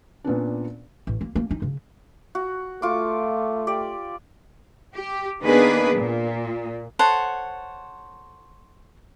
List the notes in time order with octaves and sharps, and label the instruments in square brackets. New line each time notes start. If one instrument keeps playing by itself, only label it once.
[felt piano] A#2 B3 C#4 D4
[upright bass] A1
A#3
A#3
D#4
C#3
[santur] F#4
[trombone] A3 [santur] F4 C#6 D6
[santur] G4 D5
[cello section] G4
D#3 A#3 B3 D4 G#4 B4
A#2
[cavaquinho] A4 C5 C#5 F#5